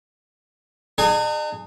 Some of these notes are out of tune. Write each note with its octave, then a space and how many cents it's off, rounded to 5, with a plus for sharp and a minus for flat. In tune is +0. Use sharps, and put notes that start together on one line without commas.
D#4 -45 G#4 +0